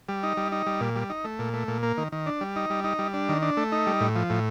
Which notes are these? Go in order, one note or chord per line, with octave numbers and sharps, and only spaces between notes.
G3
D#4
G3
D#4
G3
A#2
G3
D#4
A3
A#2
A3
A#2
A#3
D#3
D#3
D4
G3
D#4
G3
D#4
G3
D4
D#3
D4
A3
D#4
G3
A2
F3
A2